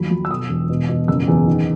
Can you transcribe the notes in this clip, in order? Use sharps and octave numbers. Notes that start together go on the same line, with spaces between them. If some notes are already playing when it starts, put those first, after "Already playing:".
Already playing: D#2 F#3 B5
F#3
E6
B2 D#6
E1
B2
B2
F#1 E6
E2
D#3